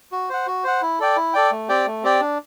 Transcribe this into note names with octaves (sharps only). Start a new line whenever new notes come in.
F#4
C5 F#5
F#4
C5 F#5
E4
A4 D5 G5
E4
A4 D5 G5
A3
C4 G4 D5 G5
A3
C4 G4 D5 G5
D4